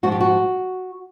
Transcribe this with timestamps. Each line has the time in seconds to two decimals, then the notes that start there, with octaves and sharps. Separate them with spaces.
0.03 G#2 F3 G#3 F#4
0.12 G4
0.20 F#4